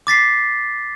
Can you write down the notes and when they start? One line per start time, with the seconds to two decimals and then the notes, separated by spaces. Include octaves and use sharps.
0.07 D6 A6 B6 C7